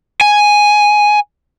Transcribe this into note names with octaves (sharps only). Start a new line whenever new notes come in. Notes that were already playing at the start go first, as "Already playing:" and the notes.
G#5